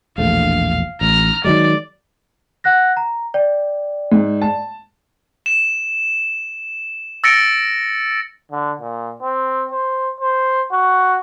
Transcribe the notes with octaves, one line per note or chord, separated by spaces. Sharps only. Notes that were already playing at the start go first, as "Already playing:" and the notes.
E1 A#1 A3 F5
A1 A#5 F6
D#3 F#3 G#3 D5
F#5 F#6 A#6
A#5
D5 G5
G#2
A5
E7
E6 A6 A#6 C#7 D7
D3
A#2
C4
C5
C5
F#4